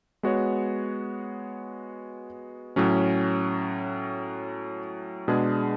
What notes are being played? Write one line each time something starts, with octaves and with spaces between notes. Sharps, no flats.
G#3 B3 F#4 C#5
A2 F#3 C#4
B2 G#3 D4 G#4